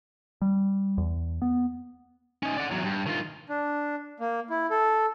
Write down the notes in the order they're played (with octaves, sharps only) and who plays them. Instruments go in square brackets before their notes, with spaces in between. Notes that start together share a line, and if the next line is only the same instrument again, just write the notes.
[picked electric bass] G3
E2
B3
[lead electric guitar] C#4 D#4
D5 F#5
E2 F#3
G2
D#3 F4
[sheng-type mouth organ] D4
A#3
E4
A4